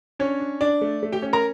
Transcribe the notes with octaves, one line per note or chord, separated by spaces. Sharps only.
C#4 D4 C#5
D4
D4 D5
A3
A3
G4 G5
C#4
A#4 A#5